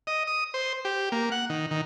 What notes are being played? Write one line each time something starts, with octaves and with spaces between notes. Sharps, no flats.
D#5
D#6
C5
G4
A#3
F#5
D#3
D#3